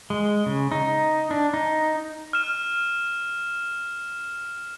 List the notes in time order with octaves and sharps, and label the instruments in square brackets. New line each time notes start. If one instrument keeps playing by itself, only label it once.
[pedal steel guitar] G#3
C#3
D#4
D4
D#4
[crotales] F6 E7